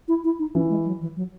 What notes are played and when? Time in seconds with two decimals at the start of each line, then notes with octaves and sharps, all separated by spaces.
0.08 E4
0.24 E4
0.39 D#4
0.55 E3 C#4
0.69 G#3
0.86 F#3
1.01 E3
1.16 F#3